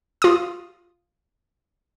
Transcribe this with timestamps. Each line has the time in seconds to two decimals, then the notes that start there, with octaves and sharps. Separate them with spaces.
0.22 F4 D#6